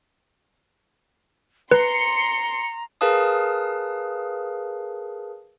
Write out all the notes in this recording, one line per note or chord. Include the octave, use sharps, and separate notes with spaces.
B4 A#5 C6 C#7
G#4 A#4 B4 F5 A5 D#6